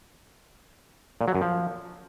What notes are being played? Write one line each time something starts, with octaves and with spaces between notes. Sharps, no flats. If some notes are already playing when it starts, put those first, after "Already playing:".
A#2
F#3
F#2
F3